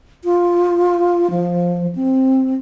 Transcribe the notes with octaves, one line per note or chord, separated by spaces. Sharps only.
F4
F3
C4